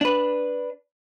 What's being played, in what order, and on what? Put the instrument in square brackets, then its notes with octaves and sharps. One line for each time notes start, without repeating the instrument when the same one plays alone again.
[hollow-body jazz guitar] D4 B4